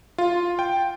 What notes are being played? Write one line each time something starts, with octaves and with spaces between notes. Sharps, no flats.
F4
G5